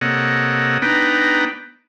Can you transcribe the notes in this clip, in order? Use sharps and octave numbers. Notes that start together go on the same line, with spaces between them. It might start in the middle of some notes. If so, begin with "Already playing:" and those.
C3 A#3 A4 C#5 D#5 F#5
B3 D4 D#4 B4 G5 A#5